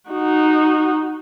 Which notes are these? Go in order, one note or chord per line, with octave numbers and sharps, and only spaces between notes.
D#4 F#4